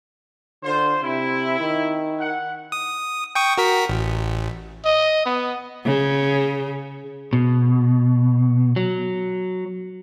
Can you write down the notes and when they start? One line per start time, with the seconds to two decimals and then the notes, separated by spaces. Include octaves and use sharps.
0.63 D3 F4 C5
1.03 C3 E4
1.60 D#3
2.19 F#5
2.72 D#6
3.35 G5 C#6 D#6
3.58 F#4 A#4 B6
3.89 A1
4.85 D#5
5.26 B3
5.85 C#3
7.33 B2
8.76 F#3